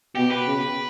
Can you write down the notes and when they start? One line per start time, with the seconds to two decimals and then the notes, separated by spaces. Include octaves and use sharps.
0.15 B2 G4
0.31 B4
0.46 C#3